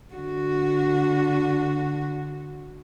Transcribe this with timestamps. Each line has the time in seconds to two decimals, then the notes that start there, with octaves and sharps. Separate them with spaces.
0.15 D3 F#4